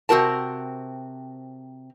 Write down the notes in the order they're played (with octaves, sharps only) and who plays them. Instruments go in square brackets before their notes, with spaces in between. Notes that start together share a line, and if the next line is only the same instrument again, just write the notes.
[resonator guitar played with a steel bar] C3 C4 F#4 A#4 A5